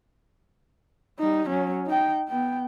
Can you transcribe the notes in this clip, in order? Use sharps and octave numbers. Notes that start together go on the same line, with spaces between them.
G3 D#4
F#3 C#4
D#4 G5
B3 G5